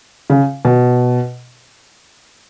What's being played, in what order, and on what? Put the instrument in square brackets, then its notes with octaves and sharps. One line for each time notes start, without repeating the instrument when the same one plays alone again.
[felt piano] C#3
B2